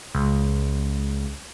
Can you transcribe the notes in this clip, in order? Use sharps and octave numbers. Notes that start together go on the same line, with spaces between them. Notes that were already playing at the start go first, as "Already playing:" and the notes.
C#2